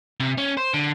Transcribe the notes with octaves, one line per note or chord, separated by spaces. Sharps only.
C3
C#4
C5
D3